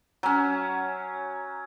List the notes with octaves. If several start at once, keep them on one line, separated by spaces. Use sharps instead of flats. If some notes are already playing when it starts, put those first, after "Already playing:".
F#3 C#4